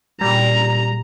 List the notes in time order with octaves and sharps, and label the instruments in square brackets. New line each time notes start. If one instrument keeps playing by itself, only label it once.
[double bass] A#2 [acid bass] G3 [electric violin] A#5